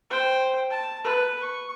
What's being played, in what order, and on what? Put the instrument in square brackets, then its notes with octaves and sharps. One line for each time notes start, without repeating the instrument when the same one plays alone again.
[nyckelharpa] C5 G5
A5
B4
C#6